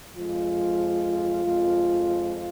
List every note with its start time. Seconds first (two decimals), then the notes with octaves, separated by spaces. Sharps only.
0.16 F2 F3 G#3 F4
1.44 F2 F3 G#3